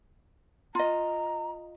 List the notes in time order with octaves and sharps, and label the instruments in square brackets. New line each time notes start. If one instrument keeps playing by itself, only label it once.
[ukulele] F4 D#5 [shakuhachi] A#5